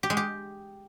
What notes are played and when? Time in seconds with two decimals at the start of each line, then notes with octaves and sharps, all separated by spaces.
0.03 G4
0.10 G#3
0.17 G4